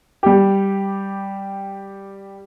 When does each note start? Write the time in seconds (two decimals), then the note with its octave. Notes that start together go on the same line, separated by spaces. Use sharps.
0.23 G3 G4